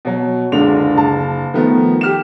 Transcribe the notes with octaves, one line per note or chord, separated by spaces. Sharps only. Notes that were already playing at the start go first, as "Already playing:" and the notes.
B2 F#3
F#1 C#2 D3 D4 F7
F#1 A5
D#3 F3 A3 B3
G4 F6 E7